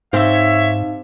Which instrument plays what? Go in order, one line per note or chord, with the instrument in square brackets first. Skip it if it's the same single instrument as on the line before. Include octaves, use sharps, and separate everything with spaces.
[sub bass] G#2 [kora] C4 G4 [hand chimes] D#4 F5 [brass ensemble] C#5 E5